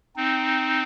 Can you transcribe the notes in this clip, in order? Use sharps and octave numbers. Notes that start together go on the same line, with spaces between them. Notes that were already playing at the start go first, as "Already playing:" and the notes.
C4 D#4